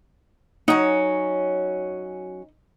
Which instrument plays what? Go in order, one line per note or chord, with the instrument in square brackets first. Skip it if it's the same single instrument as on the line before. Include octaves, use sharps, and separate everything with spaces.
[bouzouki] F#3 C#4 [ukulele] D#4